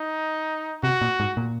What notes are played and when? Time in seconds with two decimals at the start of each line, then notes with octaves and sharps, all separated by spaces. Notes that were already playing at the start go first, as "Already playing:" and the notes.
Already playing: D#4
0.83 C3 F#4
1.01 A#2
1.20 G#2
1.37 A#2